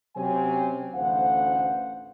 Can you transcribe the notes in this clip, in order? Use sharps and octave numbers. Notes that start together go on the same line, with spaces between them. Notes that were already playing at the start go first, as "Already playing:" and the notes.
C3 F#3 C4 C#4 G4 G#5
A1 D2 C5 F5 F#5